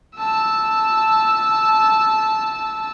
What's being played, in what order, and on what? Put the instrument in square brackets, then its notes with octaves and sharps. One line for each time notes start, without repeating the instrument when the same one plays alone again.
[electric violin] A5 E6